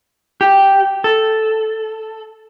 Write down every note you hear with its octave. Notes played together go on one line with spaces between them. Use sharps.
G4
A4